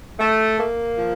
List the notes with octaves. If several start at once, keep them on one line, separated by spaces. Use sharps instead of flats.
A3
A#3
F3